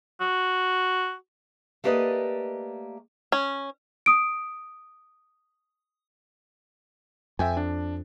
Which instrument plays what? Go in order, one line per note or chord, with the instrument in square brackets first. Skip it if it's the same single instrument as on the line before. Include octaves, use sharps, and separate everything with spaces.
[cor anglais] F#4
[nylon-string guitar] A3 A#3 G4 B4 D5 D#5
[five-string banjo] C#4
[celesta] D#6 D7
[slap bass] F2 [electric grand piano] E5 G5 G#5
[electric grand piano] D4